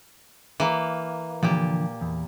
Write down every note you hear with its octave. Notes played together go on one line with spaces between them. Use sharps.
E3 A#3
A#2 D3 E3 F3 G4
E2